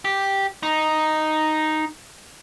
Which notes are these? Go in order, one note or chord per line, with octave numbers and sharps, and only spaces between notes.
G4
D#4